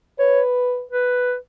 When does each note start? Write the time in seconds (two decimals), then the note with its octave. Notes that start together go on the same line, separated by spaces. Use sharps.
0.19 B4 C#5
0.91 B4